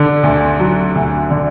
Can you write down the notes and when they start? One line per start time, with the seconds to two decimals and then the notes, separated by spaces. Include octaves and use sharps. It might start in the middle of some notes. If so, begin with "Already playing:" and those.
Already playing: D3
0.23 D2
0.59 F#3
0.95 D2
1.31 D3